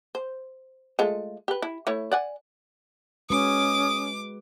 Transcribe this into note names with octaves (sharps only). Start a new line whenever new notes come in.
C5
G#3 A3 F4
G4 B4
E4
A3 E4 C#5
D5 F#5 G#5
G#3 C#4 F#4 B4 D6 D#6